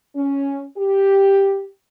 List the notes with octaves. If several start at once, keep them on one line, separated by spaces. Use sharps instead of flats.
C#4
G4